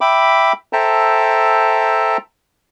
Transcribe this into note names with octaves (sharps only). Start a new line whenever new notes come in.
E5 G5 B5 D6
A4 C5 E5 G5 A5 A#5